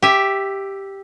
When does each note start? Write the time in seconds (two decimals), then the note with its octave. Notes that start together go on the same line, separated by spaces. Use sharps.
0.02 G4 E5